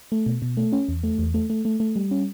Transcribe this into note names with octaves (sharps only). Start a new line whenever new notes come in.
A3
B2
B2
A3
C#4
E2
A3
E2
A3
A3
A3
A3
G3
C#4